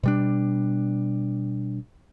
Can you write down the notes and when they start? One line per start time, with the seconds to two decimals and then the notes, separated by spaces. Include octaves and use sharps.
0.03 B2 G3 D4